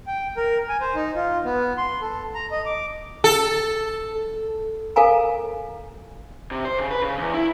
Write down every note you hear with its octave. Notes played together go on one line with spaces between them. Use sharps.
G5
A#4
G#5
C5
D#4
F4
B3
C6
A4
A#5
D#5
D6
A4
A4 A#4 F5 G#5 A#5
C3
C5
C#3
B4
C#3
E2
E4